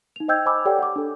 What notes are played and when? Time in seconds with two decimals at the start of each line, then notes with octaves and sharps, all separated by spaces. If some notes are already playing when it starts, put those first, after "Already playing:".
0.16 D#4 F7
0.28 C5 D#5 G5 E6 G6 G#6
0.46 C5 D#5 G#5 B5 D6 E6
0.65 G4 A4 C#5 D5 F#5 G5
0.79 F#5 D6
0.96 D4 A4